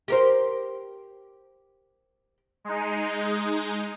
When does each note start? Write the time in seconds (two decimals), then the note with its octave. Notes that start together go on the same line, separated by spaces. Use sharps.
0.08 G4 A#4 C5
2.65 G#3 D#4